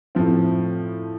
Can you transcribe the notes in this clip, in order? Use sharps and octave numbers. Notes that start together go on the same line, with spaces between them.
A2 F3 C4